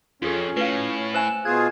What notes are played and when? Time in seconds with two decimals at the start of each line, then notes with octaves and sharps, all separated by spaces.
0.22 F2 C#4 F4 G#4 A4
0.57 A2 B4 F5 C7
1.14 C5 E5 G#5 E6 F#6 E7
1.45 B2 F4 G#4 F#6 G#6